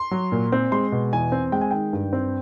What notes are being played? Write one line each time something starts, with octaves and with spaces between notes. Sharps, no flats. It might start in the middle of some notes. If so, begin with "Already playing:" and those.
Already playing: C6
F#3
A#2
C4
G#3 C6
B2
E2 G#5
C4
G#3 G5
G#5
D#3 G5
G2
C4